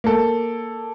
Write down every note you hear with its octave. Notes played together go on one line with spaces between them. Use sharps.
A#3 A4